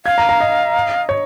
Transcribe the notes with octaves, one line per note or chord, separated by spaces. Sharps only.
F5 G#6
A#5
A#5
D#5
C#5